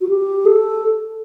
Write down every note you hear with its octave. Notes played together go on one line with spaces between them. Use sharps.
F#4
G4
A4